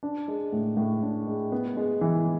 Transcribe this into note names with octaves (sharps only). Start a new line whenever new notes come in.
D4
G#3
A2
A2
D4
G#3
B3
G#3
E3